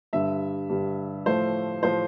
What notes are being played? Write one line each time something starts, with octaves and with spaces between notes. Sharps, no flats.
G2 D3 G3 E5
G2 D3 G3
A2 F3 A3 C5
A2 F3 A3 C5